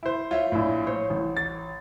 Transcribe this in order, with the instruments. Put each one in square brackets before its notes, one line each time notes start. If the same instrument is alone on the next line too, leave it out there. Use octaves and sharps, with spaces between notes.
[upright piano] E4 C5
[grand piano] F4 [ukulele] C#5 E5
[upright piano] A#1 A2
[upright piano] C5 [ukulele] C#5
[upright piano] A1
[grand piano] A6